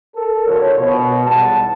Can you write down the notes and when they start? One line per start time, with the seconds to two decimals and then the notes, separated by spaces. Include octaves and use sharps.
0.15 A4 A#4
0.47 A2 D3 F3 F#4 C#5
0.78 B2
1.26 B1 E2 G3 F#5 A5